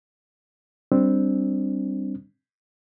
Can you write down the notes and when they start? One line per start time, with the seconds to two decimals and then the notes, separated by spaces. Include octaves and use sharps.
0.92 G3 C4 D4